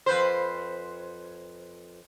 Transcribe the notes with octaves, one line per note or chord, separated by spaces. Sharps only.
F2 B4 C5